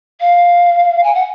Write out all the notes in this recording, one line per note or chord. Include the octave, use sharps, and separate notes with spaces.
F5
G#5
F#5